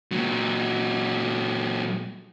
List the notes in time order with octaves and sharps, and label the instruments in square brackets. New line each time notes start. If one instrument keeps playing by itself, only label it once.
[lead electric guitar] A#2 F#3